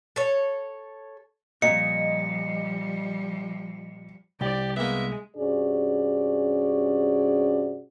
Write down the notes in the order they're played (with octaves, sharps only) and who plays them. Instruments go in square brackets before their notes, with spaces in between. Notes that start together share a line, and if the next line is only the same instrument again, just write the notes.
[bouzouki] A4 C#5
[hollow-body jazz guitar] A#2 [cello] F3 G3 [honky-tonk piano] D#5 [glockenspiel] C#7
[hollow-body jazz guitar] C2 [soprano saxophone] G4 [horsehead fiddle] D5
[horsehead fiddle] G#3 [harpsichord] A#3 B3 [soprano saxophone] E5
[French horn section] G2 C3 C#4 F#4 G#4 D5